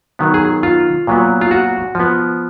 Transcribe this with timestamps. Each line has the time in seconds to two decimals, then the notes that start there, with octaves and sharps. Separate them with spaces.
0.19 D#3 F#3 B3
0.34 G#4
0.63 F4
1.07 A#2 F#3 B3
1.41 F4
1.51 F#4
1.95 F3 B3